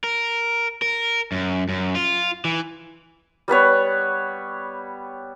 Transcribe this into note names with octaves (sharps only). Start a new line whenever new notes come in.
A#4
A#4
F#2
F#2
F4
E3
G3 B3 B4 C#5